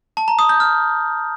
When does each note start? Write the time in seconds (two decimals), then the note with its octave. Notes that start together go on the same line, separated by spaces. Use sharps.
0.17 A5
0.28 A#5
0.39 D#6
0.49 G6
0.60 F6